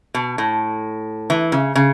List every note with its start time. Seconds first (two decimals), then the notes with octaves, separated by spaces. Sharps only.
0.14 B2
0.38 A2
1.30 E3
1.52 C#3
1.75 C#3